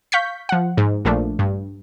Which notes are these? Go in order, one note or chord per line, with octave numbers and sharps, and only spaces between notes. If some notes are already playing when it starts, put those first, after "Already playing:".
F5 C#6 G6 B6
F3 F#5
G#2
A#1 A#2 F3 A3 D4
G2